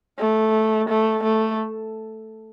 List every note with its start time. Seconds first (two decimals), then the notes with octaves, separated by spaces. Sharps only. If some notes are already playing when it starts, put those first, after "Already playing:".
0.19 A3
0.89 A3
1.24 A3